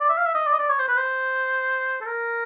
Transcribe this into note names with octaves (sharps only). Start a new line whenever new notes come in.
D5
E5
F5
E5
D#5
D5
D#5
D5
C#5
C5
B4
C5
A4
A#4